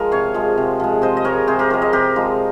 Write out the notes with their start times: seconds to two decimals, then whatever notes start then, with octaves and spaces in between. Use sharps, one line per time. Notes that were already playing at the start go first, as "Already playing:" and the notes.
Already playing: F3 G#3 A#4
0.12 C3 C#5 F5
0.34 F3 G#3
0.57 C3
0.80 F3 G#3
1.02 C3 C5 D#5
1.17 D#5
1.24 F3 G#3 A#4 C#5
1.48 C3 G#4 C5
1.59 G4 A#4
1.70 F3 G#3 A#4 C#5
1.82 C5 D#5
1.92 C3 G4 A#4
2.16 F3 G#3